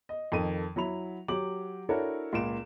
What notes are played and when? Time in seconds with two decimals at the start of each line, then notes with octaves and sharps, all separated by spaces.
0.09 D#5
0.32 F2 D#3 A4 D#7
0.76 F#3 E4 B5 F7
1.28 F#3 G4 D6 F#7
1.89 D4 E4 F#4 A4 A#4 C#5
2.33 C#2 A#2 D7 E7